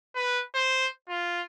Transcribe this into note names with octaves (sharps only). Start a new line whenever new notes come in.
B4
C5
F4